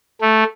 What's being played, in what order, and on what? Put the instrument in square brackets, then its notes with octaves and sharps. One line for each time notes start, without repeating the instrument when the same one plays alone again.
[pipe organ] A3